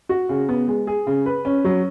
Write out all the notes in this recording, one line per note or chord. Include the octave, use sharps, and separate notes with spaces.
F#4
C#3
B3
G#3
G#4
C#3
B4
C#4
F#3